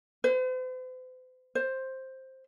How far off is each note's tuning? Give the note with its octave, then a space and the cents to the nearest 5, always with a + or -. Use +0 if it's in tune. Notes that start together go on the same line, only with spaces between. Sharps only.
C5 -45
C5 +10